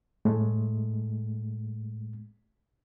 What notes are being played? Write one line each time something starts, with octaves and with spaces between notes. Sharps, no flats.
A2 G#3 A3